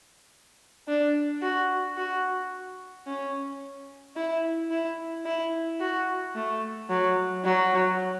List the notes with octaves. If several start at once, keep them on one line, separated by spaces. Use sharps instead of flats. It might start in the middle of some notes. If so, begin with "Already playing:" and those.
D4
F#4
F#4
C#4
E4
E4
E4
F#4
A3
F#3
F#3